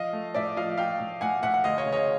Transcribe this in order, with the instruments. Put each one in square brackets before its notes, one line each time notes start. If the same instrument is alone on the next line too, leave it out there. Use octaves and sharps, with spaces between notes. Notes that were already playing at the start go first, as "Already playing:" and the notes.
Already playing: [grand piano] F3 D#5 F5
A3
A2 D5 E5
F3 D#5 F5
F3 F5 G5
A2
A2 F#5 G#5
A2 E5 F#5
F#5
D2 D#5 F5
C#5 D#5
C#3
C#5 D#5